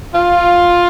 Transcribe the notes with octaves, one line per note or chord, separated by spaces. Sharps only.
F4